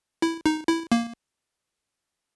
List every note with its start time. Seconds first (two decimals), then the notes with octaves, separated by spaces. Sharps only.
0.22 E4
0.46 D#4
0.68 E4
0.92 A#3